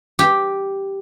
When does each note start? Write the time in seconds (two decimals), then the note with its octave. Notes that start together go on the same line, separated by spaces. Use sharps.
0.19 G4